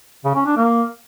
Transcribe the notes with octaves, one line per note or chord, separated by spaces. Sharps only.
C#3
C#4
D4
A#3